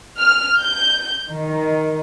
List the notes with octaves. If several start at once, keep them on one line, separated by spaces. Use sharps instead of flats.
F6
G6
D#3